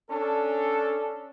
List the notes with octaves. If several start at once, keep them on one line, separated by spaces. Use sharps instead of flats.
C#4 D4 A4